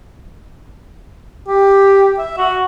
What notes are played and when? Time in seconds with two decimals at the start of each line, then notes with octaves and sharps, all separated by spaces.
1.48 G4
2.19 E5
2.38 F#4